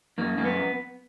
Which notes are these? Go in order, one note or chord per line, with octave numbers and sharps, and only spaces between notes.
F#2 A#3
F#2 A#3
B3